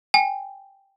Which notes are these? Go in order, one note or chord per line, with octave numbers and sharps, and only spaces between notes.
G5 G#5